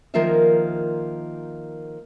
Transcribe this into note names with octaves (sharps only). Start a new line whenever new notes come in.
D#3 F3 A#3 F4 A#4 E5